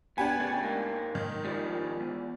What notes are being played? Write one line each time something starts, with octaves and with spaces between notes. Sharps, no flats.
B3 D4 G4 G#5
C#3 A3
G#2 A#3
D#3
G#2 F3 G3
E2